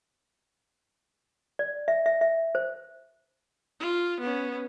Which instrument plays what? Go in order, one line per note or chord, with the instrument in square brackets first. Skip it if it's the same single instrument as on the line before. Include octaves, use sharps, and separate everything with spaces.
[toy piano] D5
E5
E5
E5
C5
[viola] F4
B3 C#4